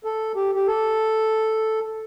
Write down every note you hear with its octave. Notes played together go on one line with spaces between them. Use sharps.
A4
G4
G4
A4